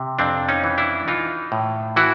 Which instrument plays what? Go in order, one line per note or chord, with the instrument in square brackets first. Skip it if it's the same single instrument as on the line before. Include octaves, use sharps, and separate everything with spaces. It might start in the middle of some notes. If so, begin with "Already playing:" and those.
Already playing: [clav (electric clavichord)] C3
F2 C4 D4
C#4 D#4
E3
D4 E4
E3 D#4 F4
A2
E3 E4 F#4